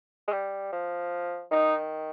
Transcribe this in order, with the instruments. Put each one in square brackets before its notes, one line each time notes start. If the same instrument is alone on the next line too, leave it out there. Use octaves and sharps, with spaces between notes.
[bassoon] G#3
G3
F3
[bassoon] D#3 [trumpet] D#4